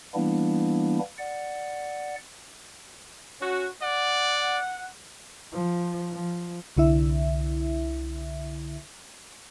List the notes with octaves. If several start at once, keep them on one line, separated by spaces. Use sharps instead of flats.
E3 G3 A#3 B3 D4 E4
D5 F#5
C#4 F#4
D5 F#5
F3
F3
C2 D3 E4 E5